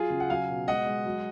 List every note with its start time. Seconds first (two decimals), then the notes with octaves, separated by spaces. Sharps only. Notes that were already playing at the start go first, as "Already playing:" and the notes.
Already playing: F#3 F4 G#4
0.10 C#3
0.20 F#5
0.30 F#3 F5 G#5
0.49 B2
0.68 G#3 D#5 F#5
0.87 G#3
1.06 F#3